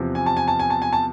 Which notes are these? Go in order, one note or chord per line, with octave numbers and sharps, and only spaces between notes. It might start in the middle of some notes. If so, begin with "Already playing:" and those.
Already playing: E2 C3 F3
G#5
A5
G#5
A5
G#5
A5
G#5
A5